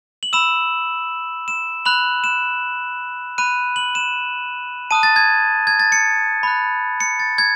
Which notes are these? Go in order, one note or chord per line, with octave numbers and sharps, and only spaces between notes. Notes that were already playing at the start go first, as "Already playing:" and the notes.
F#7
B5 E6 E7
E7
B5 F#6 F#7
E7
B5 F#6 D#7
F#7
E7
A5 D#6 F#6 D#7
A6
G#6
G#6
A6
C#7
B5 F#6
C#7
A6
G#6